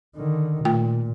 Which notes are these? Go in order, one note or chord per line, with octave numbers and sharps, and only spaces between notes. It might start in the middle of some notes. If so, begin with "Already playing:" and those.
D3 D#3
A#2 A3 F4 G5